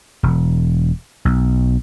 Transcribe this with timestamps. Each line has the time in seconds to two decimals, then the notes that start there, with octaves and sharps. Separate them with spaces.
0.23 E1
1.25 B1